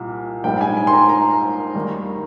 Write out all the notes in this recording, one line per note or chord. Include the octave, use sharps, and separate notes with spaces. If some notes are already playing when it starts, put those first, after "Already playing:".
Already playing: C2 A#2
A#1 G#2 G3 G5
G#5
G#5
C6
A#5
A#5
D#2 D#3 G3